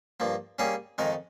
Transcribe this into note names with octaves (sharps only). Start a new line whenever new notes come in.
G2 F3 A#3
G3 A#3 C#4 G#4 C#5
F2 D#3 G#3 D#4 A#4